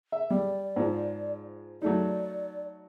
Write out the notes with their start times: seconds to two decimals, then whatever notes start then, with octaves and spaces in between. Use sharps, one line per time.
0.12 E5
0.30 G3 D5
0.76 G#2 F3
1.82 F#3 A3 D#4 D5